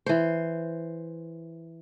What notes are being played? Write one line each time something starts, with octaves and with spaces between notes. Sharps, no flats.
E3 C5